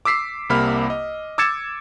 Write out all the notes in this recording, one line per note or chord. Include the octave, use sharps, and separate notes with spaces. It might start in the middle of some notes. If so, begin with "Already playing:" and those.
D6 E6 B6 C7
C2 C3 A#3 B5 F6
D#5
D6 E6 G#6 A6 C#7 E7